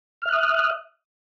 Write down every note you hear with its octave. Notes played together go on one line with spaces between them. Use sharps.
E5 D#6 F6 F#6